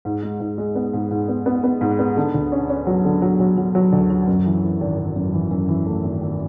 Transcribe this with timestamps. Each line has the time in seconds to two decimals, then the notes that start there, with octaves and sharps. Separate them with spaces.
0.05 G#2
0.23 G#3
0.40 G#2
0.58 G#3
0.75 B3
0.94 G#2
1.11 G#2
1.28 B3
1.46 B3
1.64 B3
1.81 G#2
1.99 B3
2.17 D3
2.34 D2
2.52 C#4
2.69 C#4
2.87 F#3
3.05 D3
3.22 F#3
3.40 F#3
3.57 F#3
3.75 F#3
3.93 D2
4.10 F#3
4.27 F#2
4.45 E3
4.63 E3
4.81 G#1
4.98 G#1
5.16 F#2
5.33 E3
5.51 F#2
5.69 E3
5.86 A3
6.04 G#1
6.21 G#1